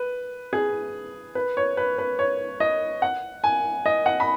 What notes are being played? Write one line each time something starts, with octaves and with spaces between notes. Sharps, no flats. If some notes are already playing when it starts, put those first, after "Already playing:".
Already playing: B4
G#4
B4
C#5
B4
B4
C#5
D#5
F#5
G#5
D#5
F#5
B5